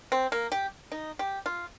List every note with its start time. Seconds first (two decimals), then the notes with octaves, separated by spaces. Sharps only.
0.12 C4
0.32 A#3
0.52 G4
0.92 D#4
1.19 G4
1.46 F4